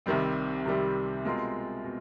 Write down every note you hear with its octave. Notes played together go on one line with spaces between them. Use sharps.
C2 C3 D#3 G3 C4
C2 C3 D#3 G3 C4
B2 G#3 C4 F4 A#4
B2